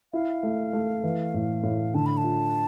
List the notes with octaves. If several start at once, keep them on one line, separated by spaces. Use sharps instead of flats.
E4 F5
A3
A3
E3
A2
A2
D3 A5
B5
A5
F4